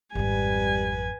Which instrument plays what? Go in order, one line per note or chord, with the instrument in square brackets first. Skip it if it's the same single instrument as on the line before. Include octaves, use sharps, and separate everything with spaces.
[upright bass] G#1 F2 [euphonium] G3 [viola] B4 G#5